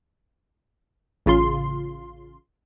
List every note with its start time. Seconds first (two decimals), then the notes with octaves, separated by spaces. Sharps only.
1.26 A1 C#3 F4 C6